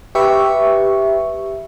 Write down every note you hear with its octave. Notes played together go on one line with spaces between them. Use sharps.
G4 B4 E5 C#6